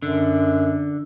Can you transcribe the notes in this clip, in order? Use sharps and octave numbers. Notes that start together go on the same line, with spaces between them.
F#2 D3